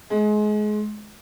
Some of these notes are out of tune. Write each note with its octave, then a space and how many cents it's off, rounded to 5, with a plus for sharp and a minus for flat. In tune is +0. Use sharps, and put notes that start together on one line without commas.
G#3 +25